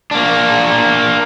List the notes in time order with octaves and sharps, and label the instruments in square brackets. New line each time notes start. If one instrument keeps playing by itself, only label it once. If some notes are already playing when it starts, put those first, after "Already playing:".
[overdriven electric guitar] A#3 D4